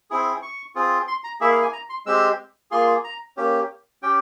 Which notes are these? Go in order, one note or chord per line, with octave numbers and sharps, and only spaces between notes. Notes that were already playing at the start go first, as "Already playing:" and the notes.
C4 E4 G#4
C#6
C4 F4 G#4
C6
A#5
A#3 E4 G#4 E5
F5
G#5
A#5
C6
G#3 C4 G4 E6
A#3 F4 G#4 C6
A#5
A#3 C#4 G4
C#4 G4 G5